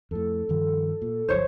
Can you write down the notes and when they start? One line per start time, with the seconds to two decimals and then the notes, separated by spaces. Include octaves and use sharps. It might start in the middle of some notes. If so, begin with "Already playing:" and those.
0.11 F2 A2 A4
0.49 G2 D#3 F3
1.02 A#2
1.29 G1 C2 F3 C5 C#5